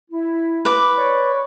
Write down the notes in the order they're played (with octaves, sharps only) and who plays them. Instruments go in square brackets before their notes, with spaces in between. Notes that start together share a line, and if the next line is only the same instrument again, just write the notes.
[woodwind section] E4
[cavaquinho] B4 D6
[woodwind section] C#5 D5 C#6